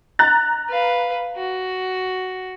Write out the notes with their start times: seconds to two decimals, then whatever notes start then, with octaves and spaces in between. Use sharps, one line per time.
0.19 A#5 F#6 A6
0.70 B4 F5
1.36 F#4